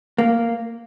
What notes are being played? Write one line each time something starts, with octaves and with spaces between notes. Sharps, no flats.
A#3